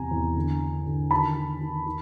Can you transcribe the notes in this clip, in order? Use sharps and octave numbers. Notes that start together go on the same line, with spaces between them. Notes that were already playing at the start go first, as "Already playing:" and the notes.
Already playing: E2 C3 G#5 A#5
E2
D3
D3
D3
D#3 A5 B5
D#3
D#3
D#3